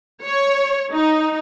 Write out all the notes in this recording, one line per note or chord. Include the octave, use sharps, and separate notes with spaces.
C#5
D#4